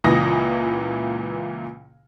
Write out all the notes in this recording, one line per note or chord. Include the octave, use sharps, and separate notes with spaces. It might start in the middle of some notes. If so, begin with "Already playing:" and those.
C#2 A#2 E3 D#6 A#6